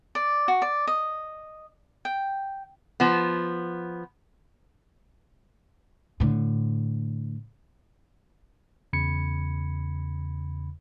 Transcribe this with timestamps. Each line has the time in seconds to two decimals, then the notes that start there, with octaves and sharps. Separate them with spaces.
0.15 D5
0.48 F#4
0.62 D5
0.87 D#5
2.05 G5
3.00 F3 B3
6.20 A2 D3
8.93 E2 C#3 B5 G#6 C#7